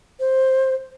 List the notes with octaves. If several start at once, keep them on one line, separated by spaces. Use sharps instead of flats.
C5